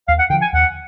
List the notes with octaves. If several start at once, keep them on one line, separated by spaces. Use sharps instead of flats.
D#2 F5
F#5
D3 F3 G5
G#5
D#2 F#5